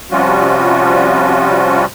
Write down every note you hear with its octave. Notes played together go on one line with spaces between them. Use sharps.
C3 F3 G3 C#4 F4 F#4